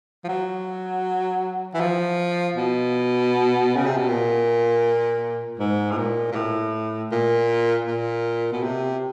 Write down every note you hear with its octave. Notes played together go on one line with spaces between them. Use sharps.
F3
F#3
E3
F3
B2
C#3
C3
B2
A#2
G#2
A2
A#2
A#2
A2
A#2
A#2
B2
C3